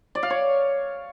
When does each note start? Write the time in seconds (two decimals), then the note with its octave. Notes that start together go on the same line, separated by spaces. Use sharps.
0.15 D5
0.23 F5
0.30 C#5